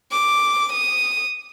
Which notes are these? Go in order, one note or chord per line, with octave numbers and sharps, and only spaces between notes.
D6
D#6